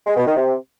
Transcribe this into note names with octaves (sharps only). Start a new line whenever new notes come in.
G#3
B2
D#3
C3